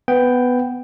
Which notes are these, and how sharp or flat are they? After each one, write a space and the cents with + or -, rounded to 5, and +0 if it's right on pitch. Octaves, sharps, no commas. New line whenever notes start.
B3 +10 G5 +0